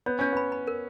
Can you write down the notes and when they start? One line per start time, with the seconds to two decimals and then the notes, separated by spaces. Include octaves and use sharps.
0.06 B3 C#5
0.19 C#4 C#5
0.32 B3 B5
0.52 B5
0.67 A#4